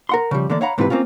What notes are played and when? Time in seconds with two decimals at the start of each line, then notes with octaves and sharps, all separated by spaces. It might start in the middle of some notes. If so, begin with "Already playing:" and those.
0.09 A#4 F#5 C6
0.31 C#3 F3 G3
0.50 D3 E3 A#3 D5
0.61 C#5 F5 F#5 A#5 B5
0.78 G#2 C3 E3 F4 G4 B4
0.90 A#3 C4 C#4 F4